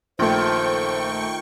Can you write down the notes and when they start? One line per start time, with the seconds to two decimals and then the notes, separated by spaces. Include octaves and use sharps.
0.19 A#1 D#3 A3 F4 C5 G5 C#6